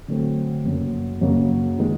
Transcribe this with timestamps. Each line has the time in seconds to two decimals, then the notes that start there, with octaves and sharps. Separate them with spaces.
0.08 D3 F#3 A3 C4
0.65 F#2 C#3 F#3 A#3
1.21 F#2 C#3 F#3 A#3
1.79 D#3 G#3